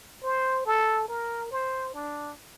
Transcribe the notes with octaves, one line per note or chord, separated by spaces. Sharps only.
C5
A4
A#4
C5
D4